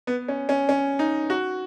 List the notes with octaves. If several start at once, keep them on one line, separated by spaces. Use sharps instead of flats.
B3
C#4
C#4
C#4
D#4
F#4